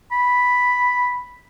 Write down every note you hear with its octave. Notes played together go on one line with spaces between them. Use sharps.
B5